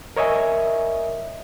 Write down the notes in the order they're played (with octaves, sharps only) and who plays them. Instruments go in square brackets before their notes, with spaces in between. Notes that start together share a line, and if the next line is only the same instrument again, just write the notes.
[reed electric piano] A#4 C#5 D#5 E5 G#5